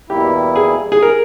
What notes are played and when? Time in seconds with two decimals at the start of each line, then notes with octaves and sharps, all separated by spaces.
0.10 E2 B2 G3 A#3 E4 G4
0.56 G#4
0.92 G#4
1.02 A#4